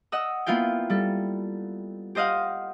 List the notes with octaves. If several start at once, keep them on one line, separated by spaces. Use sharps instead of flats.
D#5 F#5 E6
A#3 B3 E4 F4 F5 G5
G3 A4
G4 C5 D#5 F5 F#5